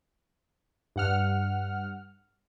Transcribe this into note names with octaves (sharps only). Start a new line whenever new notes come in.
G2 F#5 F6